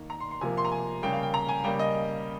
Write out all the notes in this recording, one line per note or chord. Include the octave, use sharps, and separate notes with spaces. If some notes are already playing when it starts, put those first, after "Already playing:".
Already playing: D#3 A#3
A#5
C6
C6
C3 F3 A#3 G#5
C6
A#5
G#5
C#3 G3 A#3 G5
F5
G5
A#5
G#5
C#3 G3 A#3 G5
D#5